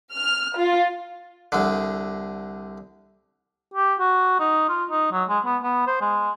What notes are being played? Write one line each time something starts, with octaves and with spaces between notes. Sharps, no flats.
F6
F4
C2 D3
G4
F#4
D#4
F4
D#4
F#3
G#3
B3
B3
C5
G#3